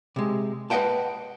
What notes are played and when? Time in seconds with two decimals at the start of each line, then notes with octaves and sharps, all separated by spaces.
0.16 C3 G#3
0.70 B4 D#5 E5 F#5 G5 A5